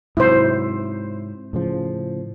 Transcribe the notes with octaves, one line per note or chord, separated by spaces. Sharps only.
G#2 C3 F#3 E4 C5
A2 C#3 F3